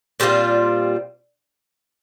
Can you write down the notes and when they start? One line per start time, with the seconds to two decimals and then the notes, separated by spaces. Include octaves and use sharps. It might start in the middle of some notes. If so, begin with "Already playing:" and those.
0.20 A#2 G3 C4 F4